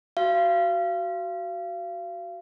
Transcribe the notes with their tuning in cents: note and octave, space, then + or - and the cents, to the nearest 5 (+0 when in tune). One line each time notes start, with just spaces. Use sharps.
F#4 +20 F5 -30